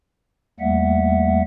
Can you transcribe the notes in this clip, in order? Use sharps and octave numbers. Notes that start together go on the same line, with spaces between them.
E2 G3 A3 A#3 E5 F#5